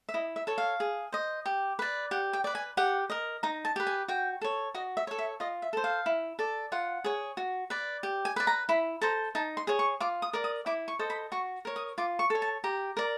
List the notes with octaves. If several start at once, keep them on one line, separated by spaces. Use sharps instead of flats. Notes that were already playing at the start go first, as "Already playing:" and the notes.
E5
E4 D#5
E5
A4 C#5
F5
G#4
C5 D#5
G4
B4 D5
G4 F#5
G5
B4 D5
G#5
G4 F#5
A#4 D#5
D#4 A#5
A5
G4 B4
G#5
F#4 G5
A4 C#5
F#4 D#5
E5
A4 C#5
E5
F4 D#5
E5
A4 C5
F5
E4
A4 D5
F4 F#5
G#4 C#5
F#4
B4 D5
G4
G#5
B4 D5
A#5
E4 B5
A4 C5 A#5
D#4 A5
C6
G#4 C#5
C#6
F4 D6
D#6
A#4 D5
D#6
E4 D6
C#6
A4 C5 D#5
B5
F#4 C#6
A#4 C#5
D#6
F4 D6
C#6
A4 C#5
A5
G4 A#5
A#4 D5